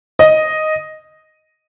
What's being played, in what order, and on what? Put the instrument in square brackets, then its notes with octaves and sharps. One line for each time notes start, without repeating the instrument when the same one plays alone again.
[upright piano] D#5